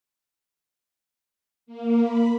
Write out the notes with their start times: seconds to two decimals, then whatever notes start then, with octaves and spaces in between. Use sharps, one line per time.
1.66 A#3
2.02 B5